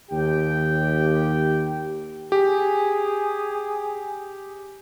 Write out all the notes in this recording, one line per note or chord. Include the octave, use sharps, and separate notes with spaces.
D#2 G4 G5
G4 G#4